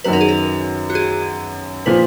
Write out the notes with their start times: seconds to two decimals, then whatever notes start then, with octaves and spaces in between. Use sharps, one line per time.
0.04 F#2 D#3 F#3 B3 B4
0.13 A#4
0.21 G#4
0.29 A#4
0.90 F#4
0.95 G#4
1.86 A#2 F3 B4